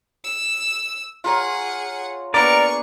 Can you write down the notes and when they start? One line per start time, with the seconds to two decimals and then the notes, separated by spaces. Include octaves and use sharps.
0.24 E6
1.24 F4 G#4 A#4 C#5 F#5
2.34 A#3 B3 D4 G#4 A#4 D5 C#6